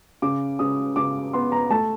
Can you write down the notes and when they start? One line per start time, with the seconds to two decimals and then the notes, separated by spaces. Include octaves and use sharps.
0.22 C#3 D6
0.59 C#3 D#6
0.96 C#3 D6
1.33 B3 C6
1.52 A#5
1.70 A3 A5